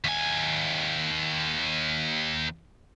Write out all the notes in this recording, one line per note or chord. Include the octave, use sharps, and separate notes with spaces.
D#2 G#5